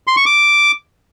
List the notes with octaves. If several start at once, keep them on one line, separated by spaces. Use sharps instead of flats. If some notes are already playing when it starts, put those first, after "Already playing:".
C6
C#6
D6